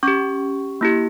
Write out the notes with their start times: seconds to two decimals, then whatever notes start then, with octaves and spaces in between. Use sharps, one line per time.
0.03 C#4 G4 C#6
0.81 A#3 E4 G4